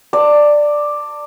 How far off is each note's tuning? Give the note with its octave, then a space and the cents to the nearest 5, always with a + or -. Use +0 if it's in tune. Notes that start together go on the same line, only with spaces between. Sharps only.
D5 +5 A5 +35